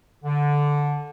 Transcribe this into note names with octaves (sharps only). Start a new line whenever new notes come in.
D3